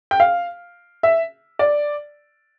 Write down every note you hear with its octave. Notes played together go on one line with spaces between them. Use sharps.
G5
F5
E5
D5